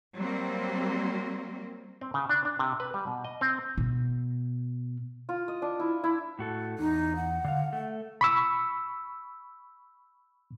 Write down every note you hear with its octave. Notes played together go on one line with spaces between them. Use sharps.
F#3 G3 A#3 C4
C4
C#3
D4
D4
C3
B4
G3
B2
D#5
C4
B2
F4
D#5
D4
E4
E4
A2 F#4 A4
E2 D#4
F#5
D3 F5
A3
B5 C#6 E6